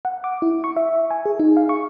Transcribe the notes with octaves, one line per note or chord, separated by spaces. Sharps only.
F#5
D6
E4
C#6
E5
G#5
G#4
D#4
F5
C#6